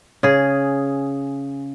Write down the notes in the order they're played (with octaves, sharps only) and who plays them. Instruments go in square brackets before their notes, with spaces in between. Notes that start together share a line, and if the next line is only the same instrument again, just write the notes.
[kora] C#3 G#4